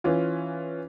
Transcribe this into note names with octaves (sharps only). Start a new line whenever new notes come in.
E3 C#4 F4